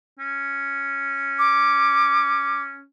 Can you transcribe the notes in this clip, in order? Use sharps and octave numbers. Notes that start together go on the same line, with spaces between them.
C#4
D6